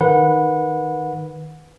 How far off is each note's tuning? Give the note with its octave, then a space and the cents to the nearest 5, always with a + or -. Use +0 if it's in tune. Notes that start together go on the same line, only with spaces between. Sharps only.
D#3 +0 B4 -5 F#5 -25